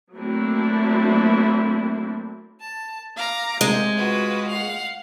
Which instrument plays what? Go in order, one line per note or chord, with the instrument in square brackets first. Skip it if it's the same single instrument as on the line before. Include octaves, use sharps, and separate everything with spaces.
[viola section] F#3 A3 A#3 C4 D4 E4
[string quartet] A5
F5 A#5 D6
[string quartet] C3 [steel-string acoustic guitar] G#3
[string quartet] F4 F#4 B4
F5 F#5